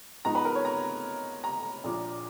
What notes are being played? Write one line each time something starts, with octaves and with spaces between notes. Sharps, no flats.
G#2 F3 B3 D#4 A#5
B4
A#4
C#5
A#5
A#5
A#1 A#2 F3